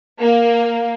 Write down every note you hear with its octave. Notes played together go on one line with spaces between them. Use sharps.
A#3